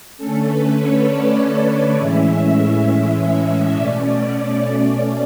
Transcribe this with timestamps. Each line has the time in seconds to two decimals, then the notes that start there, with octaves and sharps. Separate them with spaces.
0.17 D3 A3 C#4 A4
0.47 B4
0.77 C#5
1.07 D5
1.51 D5
1.96 A2 E3 G#3 C#4 E5
3.74 B2 A3 C#4 D5